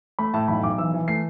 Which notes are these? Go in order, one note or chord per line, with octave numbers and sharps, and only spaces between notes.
A3 B5
A2 A5
B1 B5
B1 D6
E3 E6
E3
A3 C7